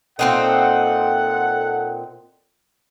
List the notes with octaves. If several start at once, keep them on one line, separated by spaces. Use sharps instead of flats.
A#2 C4 D#4 A4 F#5